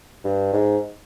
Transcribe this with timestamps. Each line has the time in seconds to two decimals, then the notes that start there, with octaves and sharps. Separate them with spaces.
0.25 G2
0.53 G#2